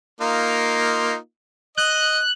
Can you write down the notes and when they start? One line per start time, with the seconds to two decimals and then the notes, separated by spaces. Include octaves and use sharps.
0.21 A#3 D#4 F4
1.78 D#5 F#6